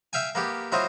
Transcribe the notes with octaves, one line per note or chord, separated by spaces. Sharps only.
E5 F5 G5 G#5
A#3 B3 G4
F#3 E4 F4 C5 D#5